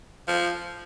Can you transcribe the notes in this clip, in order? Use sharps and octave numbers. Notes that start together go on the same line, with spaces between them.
F3